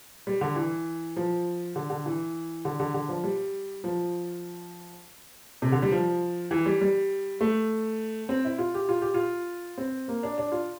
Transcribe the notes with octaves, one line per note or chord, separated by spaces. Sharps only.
G3
D3
E3
F3
D3
D3
E3
D3
D3
D3
F3
G3
F3
C3
D3
G3
F3
E3
G3
G3
A3
C4
E4
F4
G4
F4
G4
F4
C4
A#3
D4
D4
F4